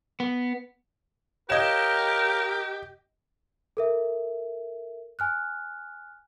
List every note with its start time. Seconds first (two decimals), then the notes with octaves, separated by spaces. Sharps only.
0.20 B3
1.50 G4 A#4 C#5 D#5 F5 G#6 E7
3.77 A4 A#4 E5
5.19 G#5 F6 F#6